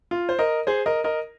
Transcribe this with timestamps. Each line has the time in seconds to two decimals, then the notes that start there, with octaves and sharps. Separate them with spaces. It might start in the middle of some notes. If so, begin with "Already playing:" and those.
0.11 F4
0.29 C5
0.39 A#4 D#5
0.67 G#4 C5
0.86 A#4 D#5
1.04 A#4 D#5